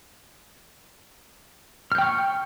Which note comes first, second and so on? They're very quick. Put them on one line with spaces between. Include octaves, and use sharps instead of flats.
F6 G6 G5 C#6